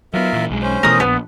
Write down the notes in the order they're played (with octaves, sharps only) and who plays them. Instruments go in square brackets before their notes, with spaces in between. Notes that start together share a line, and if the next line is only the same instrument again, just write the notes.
[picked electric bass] F#3 B3 [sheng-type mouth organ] F4 A#4 E5
[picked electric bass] A#2 E3
B1 G#3
[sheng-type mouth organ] C#4 C5
[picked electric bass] B2 E3 A3 [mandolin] A#4 D#6
[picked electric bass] D1 A#1 [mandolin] B3